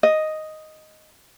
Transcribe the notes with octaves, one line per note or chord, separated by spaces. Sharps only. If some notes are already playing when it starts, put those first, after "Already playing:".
D#5